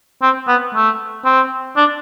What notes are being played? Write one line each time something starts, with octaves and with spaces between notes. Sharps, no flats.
C4
B3
A3
C4
D4